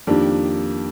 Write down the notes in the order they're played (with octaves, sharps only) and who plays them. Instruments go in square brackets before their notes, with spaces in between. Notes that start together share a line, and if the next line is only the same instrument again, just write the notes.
[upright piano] F2 D#3 A#3 D4 G4